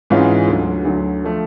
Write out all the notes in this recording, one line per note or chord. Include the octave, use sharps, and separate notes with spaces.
G#2 E3 G#3 C#4 F4
D2 D3 F#3
D2 D3 F#3
F3 A3